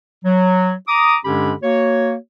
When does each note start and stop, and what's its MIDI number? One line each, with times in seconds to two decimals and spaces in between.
0.24 0.73 54
0.88 1.17 82
0.88 1.17 86
0.88 1.17 87
1.25 1.53 43
1.25 1.53 50
1.25 1.53 56
1.25 1.53 61
1.25 1.53 67
1.25 1.53 83
1.62 2.14 58
1.62 2.14 66
1.62 2.14 73